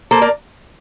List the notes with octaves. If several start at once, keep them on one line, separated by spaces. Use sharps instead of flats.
A#3 A4 C5
A#4 D5